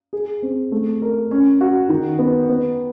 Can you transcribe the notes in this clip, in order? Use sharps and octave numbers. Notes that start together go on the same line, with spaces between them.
G#4
C4
A3
A#4
C#4
F#4
D#3
B3
B3